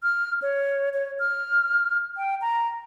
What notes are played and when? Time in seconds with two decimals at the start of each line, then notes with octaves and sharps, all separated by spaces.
0.03 F6
0.42 C#5
0.94 C#5
1.19 F6
2.17 G5
2.41 A#5